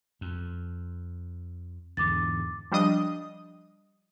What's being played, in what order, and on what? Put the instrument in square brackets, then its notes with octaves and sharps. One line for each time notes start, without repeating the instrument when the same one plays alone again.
[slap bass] F2
[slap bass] E2 G#2 D3 [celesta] D6 A6
[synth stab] F3 G3 D4 D#5 D#6